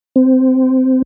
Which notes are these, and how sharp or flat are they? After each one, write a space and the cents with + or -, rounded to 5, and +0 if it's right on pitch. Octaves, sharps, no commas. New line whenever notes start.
C4 -15